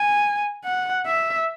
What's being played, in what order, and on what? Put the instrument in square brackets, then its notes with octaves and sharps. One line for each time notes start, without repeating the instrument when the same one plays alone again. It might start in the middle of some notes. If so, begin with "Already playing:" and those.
Already playing: [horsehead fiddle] G#5
F#5
E5